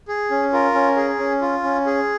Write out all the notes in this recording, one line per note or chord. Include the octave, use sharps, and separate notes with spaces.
G#4
C#4
F4 A#4
C#4
G#4
C#4
F4
C#4
G#4